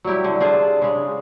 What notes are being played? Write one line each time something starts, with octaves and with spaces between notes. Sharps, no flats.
F#3 G3 E4 G4
D3
D4 F4 G#4 C5
C#3 G#3